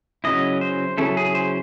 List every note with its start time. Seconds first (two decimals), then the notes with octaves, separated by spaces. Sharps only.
0.24 C#3 F#3 C#4 E4 D#5
0.61 C5
0.97 C#3 F#3 C#4 E4 A4
1.17 G#4
1.35 C5